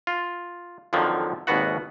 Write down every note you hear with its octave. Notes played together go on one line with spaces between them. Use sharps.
F4
F2 D3 D#3 F3 F#3
G#1 D#2 B2 B3 F#4 F#5